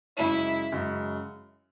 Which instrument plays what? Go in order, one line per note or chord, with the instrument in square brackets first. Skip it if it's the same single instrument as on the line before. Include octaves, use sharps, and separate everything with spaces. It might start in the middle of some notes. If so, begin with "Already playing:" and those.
[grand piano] F#2 C#3 G#3 [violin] E4
[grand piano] F#2 C#3 G#3